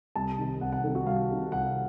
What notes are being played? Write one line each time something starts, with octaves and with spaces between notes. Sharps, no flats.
C2 A5
C3 D#3
C2 F#5
F#5
C3 D#3 A4
F#4
C2 F5
C3 D#3
C2 F#5